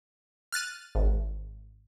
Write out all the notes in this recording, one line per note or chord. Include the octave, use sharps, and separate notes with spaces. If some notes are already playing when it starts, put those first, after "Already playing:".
F6 F#6 A6 D#7
G#1